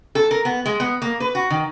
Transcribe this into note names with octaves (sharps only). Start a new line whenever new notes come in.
A4
A#4
B3
G#3
B3
A#3
B4
F#4
D#3